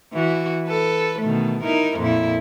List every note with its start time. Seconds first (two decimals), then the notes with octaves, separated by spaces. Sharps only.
0.13 E3 F#4
0.66 A4 B4
1.20 B2 D#3 A3
1.64 D#4 E4 A#4
1.98 F2 A#2 E4